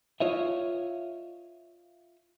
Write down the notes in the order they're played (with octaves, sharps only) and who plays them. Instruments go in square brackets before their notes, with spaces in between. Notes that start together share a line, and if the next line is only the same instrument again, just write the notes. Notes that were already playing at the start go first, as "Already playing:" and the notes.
[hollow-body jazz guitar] F4 C#5 D#5 E5